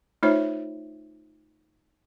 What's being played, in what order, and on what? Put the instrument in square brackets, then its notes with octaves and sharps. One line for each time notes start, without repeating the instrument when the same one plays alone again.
[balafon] A3 D#4 F4 C5 C#5 E5